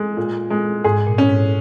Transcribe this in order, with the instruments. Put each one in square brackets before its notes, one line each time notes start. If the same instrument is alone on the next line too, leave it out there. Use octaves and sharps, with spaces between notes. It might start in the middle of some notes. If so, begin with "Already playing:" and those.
Already playing: [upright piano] G#3
A#2
G#3
[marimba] G#2 [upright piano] G#4
[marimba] A#2
[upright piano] C#4
[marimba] G#2